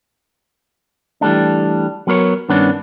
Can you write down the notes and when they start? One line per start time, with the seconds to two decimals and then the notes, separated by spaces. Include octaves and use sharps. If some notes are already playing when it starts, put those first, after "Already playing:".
1.21 E3 G3 A3 D4
2.07 F#3 B3 A#4 C5 C#5
2.49 G2 D#3 B3 C#4 D4